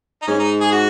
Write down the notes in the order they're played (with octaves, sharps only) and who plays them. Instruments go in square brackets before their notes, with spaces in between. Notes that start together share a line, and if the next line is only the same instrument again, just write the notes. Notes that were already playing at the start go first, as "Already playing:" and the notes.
[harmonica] D#4
[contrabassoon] G#2 [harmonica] C#4
[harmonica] D#4
G#4
F#4